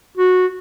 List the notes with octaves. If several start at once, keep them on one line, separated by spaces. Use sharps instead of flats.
F#4